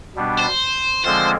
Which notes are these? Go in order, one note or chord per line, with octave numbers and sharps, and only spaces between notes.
B2 G3 B3 D4
C5
D3 F3 G#3 C4 F4 C5